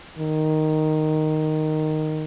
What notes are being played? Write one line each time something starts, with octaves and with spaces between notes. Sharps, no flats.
D#3